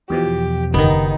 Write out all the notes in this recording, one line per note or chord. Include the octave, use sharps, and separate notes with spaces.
E2 B2 F3 G4
F#1 D#3 B3 D#4